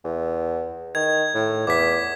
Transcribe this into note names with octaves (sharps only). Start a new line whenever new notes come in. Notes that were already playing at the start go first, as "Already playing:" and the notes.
E2
D#3 G#6
A2
E2 D6 B6